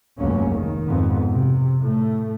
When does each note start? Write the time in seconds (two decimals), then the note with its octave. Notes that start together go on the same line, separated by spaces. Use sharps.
0.18 F1 C#2 G2 F#3 A#3 C#4
0.52 G2 D#3
0.88 F2 G#2 B3
1.31 C3
1.81 A2 A3